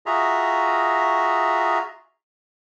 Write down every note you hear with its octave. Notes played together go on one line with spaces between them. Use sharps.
F4 F#4 G#4 D#5 E5 A#5